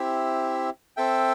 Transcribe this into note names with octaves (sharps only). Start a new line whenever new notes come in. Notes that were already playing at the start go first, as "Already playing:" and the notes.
Already playing: C4 E4 G4 E5
C4 A4 E5 G5